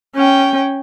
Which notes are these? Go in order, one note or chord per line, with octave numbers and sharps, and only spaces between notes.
C#4 G5